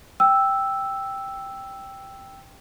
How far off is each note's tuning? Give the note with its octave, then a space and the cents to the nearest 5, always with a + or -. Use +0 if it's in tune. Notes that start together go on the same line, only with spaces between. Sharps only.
G5 +0 E6 +0